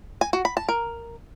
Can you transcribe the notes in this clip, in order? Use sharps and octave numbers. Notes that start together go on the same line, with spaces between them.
G#5
F#4
B5
A5
A#4